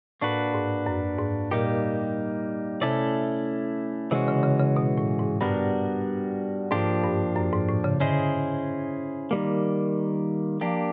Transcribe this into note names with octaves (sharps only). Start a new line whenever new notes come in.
A2 A#3 D4 F#4 B4
G#2
F#2
G#2
A#2 G3 A#3 D#4 G4
C3 A3 C#4 E4 A4 D5
C3 E3 G#3 C#4 F#4
C#3
C#3
C#3
B2
A2
G#2
G2 G3 B3 D4 F#4 A#4
G#2 F3 A#3 D4 G4
G2
F#2
G#2
A2
C#3
D3 C#4 E4 G#4 C5 D#5
D#3 G3 A#3
F3 A#3 D4 G4